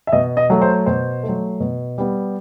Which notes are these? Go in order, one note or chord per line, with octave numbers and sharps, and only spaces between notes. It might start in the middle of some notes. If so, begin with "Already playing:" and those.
E5
B2 D#5
D#5
F#3 A3
C5
B2 C5
A3
F#3
B2
G3 B3